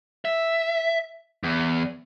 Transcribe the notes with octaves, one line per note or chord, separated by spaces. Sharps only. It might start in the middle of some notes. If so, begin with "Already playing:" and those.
E5
E2